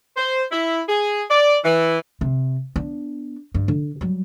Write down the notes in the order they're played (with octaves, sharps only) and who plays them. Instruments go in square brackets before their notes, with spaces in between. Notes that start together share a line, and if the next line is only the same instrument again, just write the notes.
[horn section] C5
E4
G#4
D5
E3
[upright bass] C3
B3 D4
G2
D3
F#3 G3